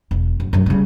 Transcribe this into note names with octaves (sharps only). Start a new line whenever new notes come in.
E1
F#2
F#2 F#3
C#3 G3